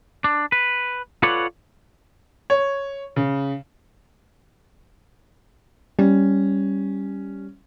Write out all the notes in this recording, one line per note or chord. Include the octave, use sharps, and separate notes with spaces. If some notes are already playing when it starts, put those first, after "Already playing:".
D4
B4
F4 A4 B4 C#5 D5 F#5
C#5
C#3
G3 C#4